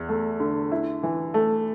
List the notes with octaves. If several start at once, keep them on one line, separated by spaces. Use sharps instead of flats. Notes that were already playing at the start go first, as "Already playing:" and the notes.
Already playing: E2
A3
D3
E4
E3
A3